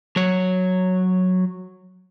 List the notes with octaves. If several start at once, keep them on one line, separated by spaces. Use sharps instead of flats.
F#3 C#5